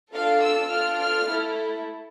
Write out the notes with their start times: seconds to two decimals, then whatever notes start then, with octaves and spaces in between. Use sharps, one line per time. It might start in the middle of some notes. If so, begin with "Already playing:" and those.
0.13 D4 F4 A4 F5
0.41 E6
0.69 D4 F4 A4 F6
0.98 F6
1.26 A3 E4 A4